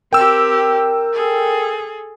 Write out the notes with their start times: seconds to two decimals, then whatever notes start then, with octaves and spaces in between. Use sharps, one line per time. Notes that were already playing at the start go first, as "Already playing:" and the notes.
0.13 C4 G4 A#4 G5 E6
1.13 G#4 A4